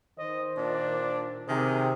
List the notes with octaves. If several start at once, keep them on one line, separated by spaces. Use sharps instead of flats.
D#3 C5 D#5
A#2 D4
C3 D#3 G#4